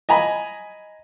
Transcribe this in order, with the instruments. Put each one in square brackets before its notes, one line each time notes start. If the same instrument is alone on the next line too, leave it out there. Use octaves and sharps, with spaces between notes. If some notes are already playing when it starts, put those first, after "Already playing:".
[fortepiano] D#5 G#5 A#5 B5